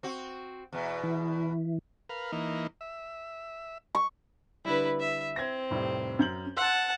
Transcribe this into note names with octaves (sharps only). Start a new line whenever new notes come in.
C4 F#4
E2 B2
E3
A#4 B4 F5
E3 A#3 D#4
E5
C#6
D3 G3 E4 B4
E5
C4 G#6 A#6
F1 A2 G3
F#2 G6 F#7
F#5 A5 C6 E6 F#6